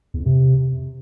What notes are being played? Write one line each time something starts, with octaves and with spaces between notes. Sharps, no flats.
E2
F2
C3